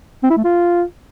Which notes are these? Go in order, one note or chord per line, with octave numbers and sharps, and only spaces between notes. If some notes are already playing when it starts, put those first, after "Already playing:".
C4
E4
A3
F4